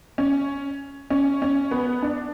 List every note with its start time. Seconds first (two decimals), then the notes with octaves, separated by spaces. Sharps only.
0.18 C#4
1.10 C#4
1.42 C#4
1.71 B3
2.02 D4